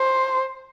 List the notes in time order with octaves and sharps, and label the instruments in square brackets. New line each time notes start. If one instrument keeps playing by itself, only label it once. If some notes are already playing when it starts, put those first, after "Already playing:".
Already playing: [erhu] C5